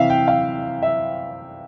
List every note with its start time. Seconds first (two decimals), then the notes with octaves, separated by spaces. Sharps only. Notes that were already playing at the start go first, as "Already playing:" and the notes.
Already playing: C3 E3 E5 F5
0.10 G5
0.28 F5
0.83 E5